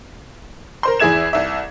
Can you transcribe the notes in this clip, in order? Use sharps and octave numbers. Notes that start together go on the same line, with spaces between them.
A#4 C5 C6
E2 E4 G#4 E5 G#6 E7
C2 E5